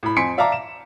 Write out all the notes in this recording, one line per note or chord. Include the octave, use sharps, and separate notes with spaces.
A2 B5
F2 G#5 C6 B6 C#7 D7
D5 E5 F5 A5 A#5 D6
E7